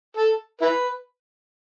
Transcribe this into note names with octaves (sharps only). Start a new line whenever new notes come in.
A4
E4 B4